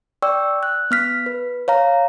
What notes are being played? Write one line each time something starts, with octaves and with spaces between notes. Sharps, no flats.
D5 G5 C#6 E6
F#6
B3 F6 B6
B4
C#5 F5 A#5